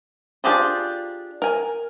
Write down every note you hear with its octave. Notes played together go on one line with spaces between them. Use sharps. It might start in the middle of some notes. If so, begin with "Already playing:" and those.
D4 F4 G4 G#4 C5
A#4 G#5